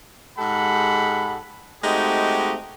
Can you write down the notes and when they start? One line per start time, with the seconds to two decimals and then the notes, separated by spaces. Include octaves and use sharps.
0.38 G#2 G#3 G4 A4 F#5 B5
1.83 G#3 A3 C4 D#4 F#4 G4